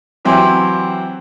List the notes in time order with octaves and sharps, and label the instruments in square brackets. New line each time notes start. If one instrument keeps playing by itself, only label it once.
[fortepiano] E3 F#3 C4 E4 G4 C5